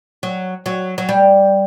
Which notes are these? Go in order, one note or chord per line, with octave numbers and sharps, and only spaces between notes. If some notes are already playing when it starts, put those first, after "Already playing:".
F#3
F#3
F#3
G3